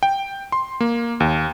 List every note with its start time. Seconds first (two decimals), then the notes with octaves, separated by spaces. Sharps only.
0.03 G5
0.52 C6
0.80 A#3
1.20 D#2